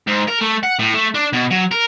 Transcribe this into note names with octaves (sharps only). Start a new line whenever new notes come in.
G#2
A#4
A3
F#5
A2
A3
D4
B2
F#3
A#4